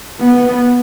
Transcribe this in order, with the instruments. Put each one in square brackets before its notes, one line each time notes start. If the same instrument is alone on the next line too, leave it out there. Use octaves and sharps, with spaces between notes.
[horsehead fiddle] B3